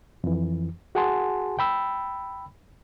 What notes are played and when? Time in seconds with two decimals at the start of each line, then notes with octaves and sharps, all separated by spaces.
0.24 F2 E3
0.95 F#4 G#4 F#5 G#5 A5 C6
1.59 G5 B5 E6